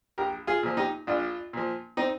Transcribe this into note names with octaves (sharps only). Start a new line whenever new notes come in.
A#1 G4 A#4
F4 G#4
A#2 F3
D#4 G4
A#1 D4 F4
A#2 F3
C4 D#4